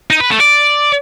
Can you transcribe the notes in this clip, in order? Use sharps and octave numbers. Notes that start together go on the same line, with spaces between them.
D#4
B4
A3
D5